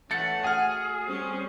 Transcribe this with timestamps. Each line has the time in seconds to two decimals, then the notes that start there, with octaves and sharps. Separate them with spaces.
0.11 E3 A3 C#4 F#5 A6 C#7
0.44 A3 F#4 G#4 F#5 G#5 F6
1.07 G3 C4 C#4